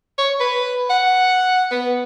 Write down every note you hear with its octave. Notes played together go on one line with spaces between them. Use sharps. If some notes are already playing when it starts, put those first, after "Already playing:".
C#5
B4
F#5
B3